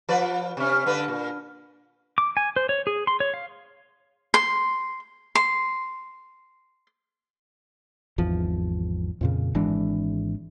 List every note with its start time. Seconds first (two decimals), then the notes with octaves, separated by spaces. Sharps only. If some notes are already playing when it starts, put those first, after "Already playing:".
0.09 F3 B4 D5
0.57 C3 C#4
0.86 G2 D3 B4
1.08 A#2
2.18 D6
2.37 G#5
2.56 C5
2.69 C#5
2.87 G#4
3.07 C6
3.20 C#5
3.34 F5
4.34 C6
5.35 C6
8.18 G#1 E2 F3
9.21 F2 A#2 C#3
9.55 G#1 E3 G#3 D4